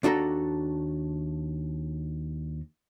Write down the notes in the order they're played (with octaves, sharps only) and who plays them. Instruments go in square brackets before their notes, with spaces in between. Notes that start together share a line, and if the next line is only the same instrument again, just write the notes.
[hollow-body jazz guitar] D#2 D4 F#4 A4 A#5